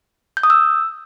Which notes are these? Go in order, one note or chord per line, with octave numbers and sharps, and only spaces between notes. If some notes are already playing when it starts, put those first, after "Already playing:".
G6
D#6
E6